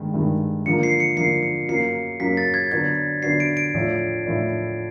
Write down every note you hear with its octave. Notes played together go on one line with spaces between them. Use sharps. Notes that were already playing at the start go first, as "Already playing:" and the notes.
Already playing: G2 D#3 G#3
G2 D#3 G#3
D3 F3 A#3 C#7
C7
C#7
D3 F3 A#3 C7
C#7
F#2 C#3 F#3 A#3 C7
F#2 C#3 F#3 A#3 B6
A6
G#6
D3 F#3 B3 D4 F#4 G#6
D3 F#3 B3 D4 F#4 C7
D7
D7
A2 F3 A3 D4
A2 F3 A3 D4